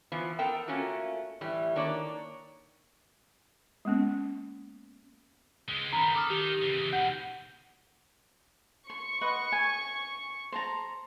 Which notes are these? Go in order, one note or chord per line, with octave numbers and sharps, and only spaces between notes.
E3 F3 B3
B3 A4 A#4 G5 A5
A3 A#3 C#4 F4 F#4
A2 E3 G3
D#3 A#3 D4 C#5 D5
G#3 A#3 B3 C#4
C#3 G#3
D#3 B3 A#5 B5
A4 D6 D#6 F6
D#3 G4
C#3 E3
D#2 B2 F#5 G6
C6 C#6
B4 D#5 F#5
G#5
C5 A5 A#5